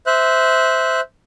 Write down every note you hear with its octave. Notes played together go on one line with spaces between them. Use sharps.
C5 E5 F#6